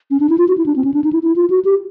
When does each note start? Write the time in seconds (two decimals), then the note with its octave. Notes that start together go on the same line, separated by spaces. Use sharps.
0.10 C#4
0.20 D4
0.29 E4
0.38 F4
0.48 F#4
0.57 E4
0.66 D4
0.76 C4
0.84 C#4
0.94 D4
1.04 D#4
1.12 E4
1.23 E4
1.36 F4
1.50 F#4
1.65 G4